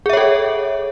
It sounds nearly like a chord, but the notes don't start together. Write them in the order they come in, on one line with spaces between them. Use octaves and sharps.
G#4 E5 C#5 A4